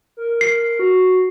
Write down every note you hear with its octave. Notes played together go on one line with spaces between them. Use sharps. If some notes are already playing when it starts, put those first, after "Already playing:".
A#4
C7
F#4